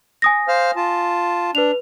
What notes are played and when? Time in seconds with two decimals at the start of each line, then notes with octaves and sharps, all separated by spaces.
0.22 G#5 D#6 A#6
0.48 C5 F5 F6
0.76 F4 A5
1.55 D4 B4 F7